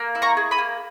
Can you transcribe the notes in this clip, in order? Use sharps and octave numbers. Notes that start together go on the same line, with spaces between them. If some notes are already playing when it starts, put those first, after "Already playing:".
Already playing: A#3
E4
A#5 C#6
G#4
B5 D#6
A#3